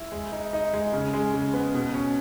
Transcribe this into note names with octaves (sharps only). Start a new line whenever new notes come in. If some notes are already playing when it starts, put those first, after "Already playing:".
Already playing: E4
G#3
D#4
D#4
G#3
C#3
G#3
C#3
B3
B2
C#4